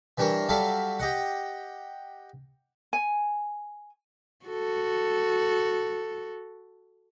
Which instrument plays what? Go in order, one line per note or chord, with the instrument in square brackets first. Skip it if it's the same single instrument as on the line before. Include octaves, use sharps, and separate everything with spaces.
[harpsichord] E3 G3 D4 A#4 C#5
F#3 G3 A4 D5 E5 F5
G4 D#5 F#5
[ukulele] G#5
[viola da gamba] F#4 A4